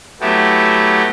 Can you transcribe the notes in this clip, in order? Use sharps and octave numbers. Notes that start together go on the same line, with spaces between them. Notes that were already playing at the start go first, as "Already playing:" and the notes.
F#3 A3 B3 E4 G4